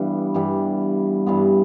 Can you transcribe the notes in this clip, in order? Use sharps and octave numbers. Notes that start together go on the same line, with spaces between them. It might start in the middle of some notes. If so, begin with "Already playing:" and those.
Already playing: G2 E3 G3 B3
G2 E3 G3 B3
G2 E3 G3 B3